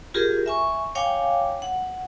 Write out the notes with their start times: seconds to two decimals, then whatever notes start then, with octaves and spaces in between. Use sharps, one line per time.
0.14 F4 G4 G#4 A#4
0.46 E5 G#5 C#6
0.95 C#5 F5 G5 G#5 D6
1.62 F#5